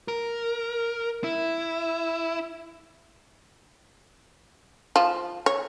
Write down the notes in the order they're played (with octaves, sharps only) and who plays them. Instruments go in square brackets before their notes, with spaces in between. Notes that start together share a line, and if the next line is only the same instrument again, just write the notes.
[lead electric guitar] A#4
E4
[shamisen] F3
C#5